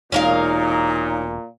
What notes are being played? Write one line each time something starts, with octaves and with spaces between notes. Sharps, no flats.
E1 A#2 C#4 D#4 A#4 F5